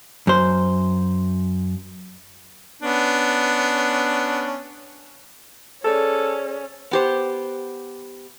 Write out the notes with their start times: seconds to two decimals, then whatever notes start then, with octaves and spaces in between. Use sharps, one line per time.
0.27 F#2 C5
2.82 B3 C#4 D4
5.84 C#4 G#4 A4 C5 D5
6.91 B3 G4 C5